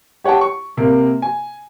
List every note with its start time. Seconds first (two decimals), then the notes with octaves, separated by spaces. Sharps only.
0.24 G4 C#5 F#5 G5 A5
0.41 C#6
0.77 C3 A#3
1.22 G#5